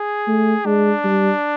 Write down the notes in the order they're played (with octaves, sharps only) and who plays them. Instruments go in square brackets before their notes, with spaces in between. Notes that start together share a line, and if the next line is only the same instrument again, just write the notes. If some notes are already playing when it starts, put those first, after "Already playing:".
Already playing: [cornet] G#4
[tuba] A3
[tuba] G#3 [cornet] D4
[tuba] G3